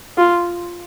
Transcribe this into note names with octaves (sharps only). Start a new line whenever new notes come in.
F4